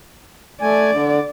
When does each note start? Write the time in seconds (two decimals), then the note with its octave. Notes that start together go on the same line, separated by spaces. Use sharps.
0.61 A3 D5 G#5
0.92 D3